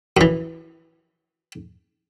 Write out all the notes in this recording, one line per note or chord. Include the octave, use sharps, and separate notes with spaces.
F#2 E3